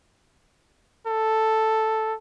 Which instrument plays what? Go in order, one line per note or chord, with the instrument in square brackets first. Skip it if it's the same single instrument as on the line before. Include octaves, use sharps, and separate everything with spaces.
[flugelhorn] A4